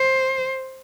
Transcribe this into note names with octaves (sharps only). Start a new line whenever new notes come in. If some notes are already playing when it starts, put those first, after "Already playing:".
Already playing: C5